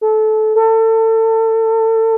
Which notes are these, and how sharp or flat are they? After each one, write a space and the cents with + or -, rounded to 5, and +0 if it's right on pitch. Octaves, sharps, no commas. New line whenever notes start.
A4 -20
A4 +30